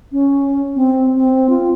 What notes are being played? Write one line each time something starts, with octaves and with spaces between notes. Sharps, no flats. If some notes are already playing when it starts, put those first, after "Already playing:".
C#4
C4
C4
F4